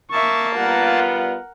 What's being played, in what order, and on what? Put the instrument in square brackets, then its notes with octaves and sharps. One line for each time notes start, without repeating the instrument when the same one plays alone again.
[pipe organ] A#3 A5 [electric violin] E5 C#6
[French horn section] G3 B3 F4 [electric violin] A#4 F#5